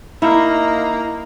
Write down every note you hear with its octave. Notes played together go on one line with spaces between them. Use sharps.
A#3 D#4 E4 A#5